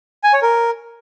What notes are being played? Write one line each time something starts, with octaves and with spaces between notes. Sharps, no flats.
G#5
C#5
A#4